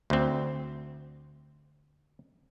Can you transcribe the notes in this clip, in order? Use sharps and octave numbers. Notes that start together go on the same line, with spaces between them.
D2 C4